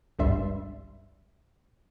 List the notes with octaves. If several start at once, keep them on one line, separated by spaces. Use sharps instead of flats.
G#1 C#2 G2 G3 E5 C6